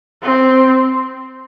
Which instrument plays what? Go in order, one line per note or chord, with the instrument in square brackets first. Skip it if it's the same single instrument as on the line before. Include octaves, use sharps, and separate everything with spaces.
[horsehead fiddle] C4